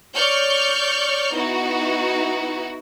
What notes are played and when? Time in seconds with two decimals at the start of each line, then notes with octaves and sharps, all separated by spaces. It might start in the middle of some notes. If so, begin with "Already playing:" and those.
0.14 C#5 D5 C#6 F6 G6
1.34 B3 D#4 E4 F#4